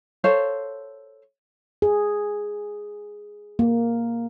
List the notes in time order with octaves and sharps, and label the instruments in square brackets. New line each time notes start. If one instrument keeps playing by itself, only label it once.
[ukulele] A4 C5 C#5 F5
[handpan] G#4
A#3